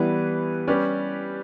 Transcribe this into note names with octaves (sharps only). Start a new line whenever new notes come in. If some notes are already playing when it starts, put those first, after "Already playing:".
Already playing: E3 G3 B3 E4 B4
G3 C#4 G4 B4 D5